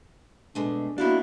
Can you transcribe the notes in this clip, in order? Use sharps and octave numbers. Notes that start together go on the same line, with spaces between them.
B2 G#3 A3 D4
A#3 B3 D4 E4 F#4 F5